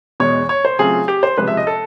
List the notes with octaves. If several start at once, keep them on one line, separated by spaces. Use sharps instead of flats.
E2 B2 G#3 C#5
C#5
C5
C#3 F#3 A3 C4 F4 G#4
G4
C5
C#2 C3 F3 G#3 B4
E5
D#5
A4